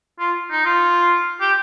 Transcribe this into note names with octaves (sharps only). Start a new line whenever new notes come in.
F4
D#4
F4
G4